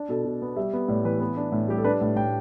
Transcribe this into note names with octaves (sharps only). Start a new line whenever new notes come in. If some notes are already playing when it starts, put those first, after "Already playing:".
Already playing: D4
B2 A4
B2
B3
G3 E5
B3
A2 D5
E3 B4
B3
D4
A2
G3 G4
A4
D4 B4
A2
A2 G5